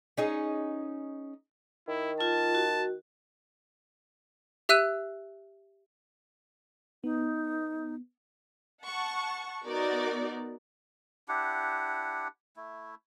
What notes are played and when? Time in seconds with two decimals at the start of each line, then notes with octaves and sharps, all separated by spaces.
0.17 C#4 D#4 G#4
1.88 D#3 E4
2.21 F4 A5
2.55 F#4
4.69 G4 E5 E6 F#6 D#7
7.04 B3 D#4
8.84 F#5 A5 C#6
9.66 B3 D#4 F#4 A#4 D5
11.28 D4 E4 G4 F#5
12.57 A3 E4